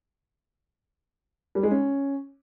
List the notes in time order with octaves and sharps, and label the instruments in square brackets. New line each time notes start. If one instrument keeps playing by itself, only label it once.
[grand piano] G3
G#3
C#4